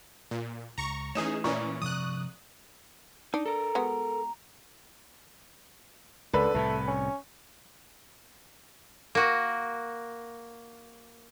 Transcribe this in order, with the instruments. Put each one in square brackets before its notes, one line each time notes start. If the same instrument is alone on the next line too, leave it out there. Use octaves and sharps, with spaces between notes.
[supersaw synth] A#2
[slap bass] C#2 [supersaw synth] A#5 C#6
[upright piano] E3 D#6 E7 [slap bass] A3 [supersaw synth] C#4 D#4 G#4
[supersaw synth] A#2 E3 C#4 [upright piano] D5 A#5 C#6
[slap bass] G2 C3 F3 [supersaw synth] D#6 F#6
[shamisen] D4 [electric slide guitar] D#4
[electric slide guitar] A4 A#4 [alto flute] A#5
[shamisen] G#3 B3 F#4
[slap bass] C#2 [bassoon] D3 [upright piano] A4 B4
[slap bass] C2 A2 C3 [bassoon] A3
[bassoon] C#4
[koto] A#3 F#4